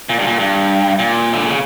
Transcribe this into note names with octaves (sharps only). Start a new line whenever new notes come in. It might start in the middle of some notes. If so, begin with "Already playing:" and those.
A#2
G2
A#2
G2
A#2
D3
C#3